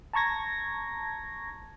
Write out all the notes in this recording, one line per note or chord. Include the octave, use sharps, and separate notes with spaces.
A5 A#5 C#6 G#6 A#6